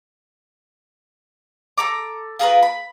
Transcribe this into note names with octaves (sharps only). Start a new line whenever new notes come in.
A4 A#5 D6
F4 G#4 A#4 B4
B5